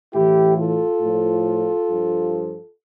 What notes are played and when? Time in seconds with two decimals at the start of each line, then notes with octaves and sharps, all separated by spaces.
0.13 A2 E3 E4 G4
0.57 F4 A4
1.01 A2 F3
1.88 G2 F3